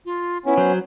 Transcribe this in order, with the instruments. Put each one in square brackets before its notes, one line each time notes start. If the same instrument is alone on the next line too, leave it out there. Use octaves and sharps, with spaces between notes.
[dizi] F4
[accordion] B3 C#4 [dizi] E4
[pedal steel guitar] F#3 [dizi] C5